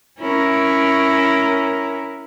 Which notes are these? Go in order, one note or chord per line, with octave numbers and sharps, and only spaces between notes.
C#4 E4 A#4